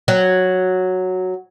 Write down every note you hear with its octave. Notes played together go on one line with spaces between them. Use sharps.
F#3